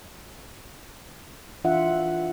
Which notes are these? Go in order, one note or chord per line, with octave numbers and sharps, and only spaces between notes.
E3 D4 F4 E5 F#5